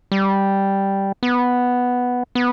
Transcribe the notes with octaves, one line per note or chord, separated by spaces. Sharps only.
G3
B3
B3